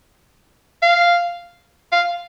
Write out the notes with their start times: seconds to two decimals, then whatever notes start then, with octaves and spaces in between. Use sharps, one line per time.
0.82 F5
1.92 F5